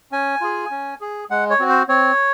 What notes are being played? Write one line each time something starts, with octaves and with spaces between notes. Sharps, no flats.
C#4 G#5
F4 G#4
C#4
G#4
G#3 F#5
C#5
C4 F#4
C5
C4 C#5